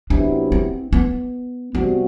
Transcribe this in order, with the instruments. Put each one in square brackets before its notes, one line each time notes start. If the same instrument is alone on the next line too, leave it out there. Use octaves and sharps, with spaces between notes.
[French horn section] C3 F#3 B3 E4 [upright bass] D4
[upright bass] C4
B3
[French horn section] C3 G3 C4 F#4 [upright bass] B3